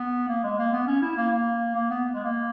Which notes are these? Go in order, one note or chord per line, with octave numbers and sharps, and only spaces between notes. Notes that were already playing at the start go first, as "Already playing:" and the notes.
Already playing: B3
A#3
G#3
A#3
B3
C#4
E4
A#3
A#3
A#3
B3
G#3
A#3